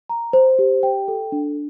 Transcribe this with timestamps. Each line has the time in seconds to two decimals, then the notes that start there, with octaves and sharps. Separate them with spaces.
0.09 A#5
0.33 C5
0.59 G4
0.83 G5
1.08 A4
1.32 D4